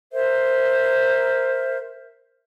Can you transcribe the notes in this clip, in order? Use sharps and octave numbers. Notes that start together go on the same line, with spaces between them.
A#4 C5 E5